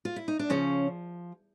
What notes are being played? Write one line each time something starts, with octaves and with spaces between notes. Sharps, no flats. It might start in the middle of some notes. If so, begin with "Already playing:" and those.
F4
E4
D#4
D4
C#3 F3 C#4